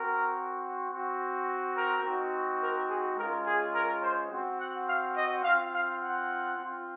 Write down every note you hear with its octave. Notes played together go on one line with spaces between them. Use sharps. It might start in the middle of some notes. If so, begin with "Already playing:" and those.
Already playing: C4 F#4 A#4
C4 F#4
A#4
C4 D#4 F#4
A#4
G#4
G#3 C#4 F4 A#4
G#4
A#4
C5
C4 F#4
F#5
F5
D#5
C4 F4 F5
F5
F#5
C4 F4